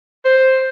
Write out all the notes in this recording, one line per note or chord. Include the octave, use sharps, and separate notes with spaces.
C5